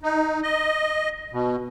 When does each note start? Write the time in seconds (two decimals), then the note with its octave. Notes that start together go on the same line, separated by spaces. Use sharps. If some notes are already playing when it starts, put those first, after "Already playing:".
0.03 D#4
0.43 D#5
1.33 B2